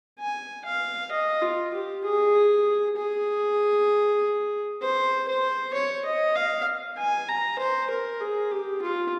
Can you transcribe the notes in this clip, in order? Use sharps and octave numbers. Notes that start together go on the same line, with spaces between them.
G#5
F5
D#5
F4
G4
G#4
G#4
C5
C5
C#5
D#5
F5
G#5
A#5
C5
A#4
G#4
G4
F4